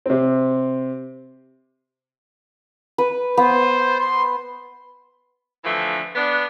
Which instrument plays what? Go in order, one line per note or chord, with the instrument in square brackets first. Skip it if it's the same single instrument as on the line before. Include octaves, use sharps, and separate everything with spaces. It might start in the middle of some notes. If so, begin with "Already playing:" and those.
[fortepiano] C3 C4
[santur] B4
[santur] B3 [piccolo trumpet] C5
[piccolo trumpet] C6
[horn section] D3 E3 F3 A3
B3 D4